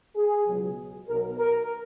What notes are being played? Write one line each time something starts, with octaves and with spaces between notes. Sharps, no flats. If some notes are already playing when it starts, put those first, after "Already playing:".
G#4
C#2 B2 F#3
B1 B2 F#3 A#4
A#4